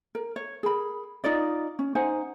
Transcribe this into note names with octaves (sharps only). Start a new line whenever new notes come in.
A#4
C#5
G#4 A#4 B5
D#4 F4 D5 D#5
C#4
D#4 C5 F#5 G#5